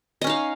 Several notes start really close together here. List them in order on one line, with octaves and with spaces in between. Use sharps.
D#5 C#4 D#4 F5